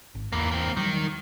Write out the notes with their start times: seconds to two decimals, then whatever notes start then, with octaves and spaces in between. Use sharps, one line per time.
0.15 G#1
0.33 E2 E3 A#3
0.51 A#3 C4
0.77 D#3 F#3 G3